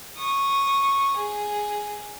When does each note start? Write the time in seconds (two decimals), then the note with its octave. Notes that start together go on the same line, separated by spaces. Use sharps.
0.18 C#6 D#6
1.17 G#4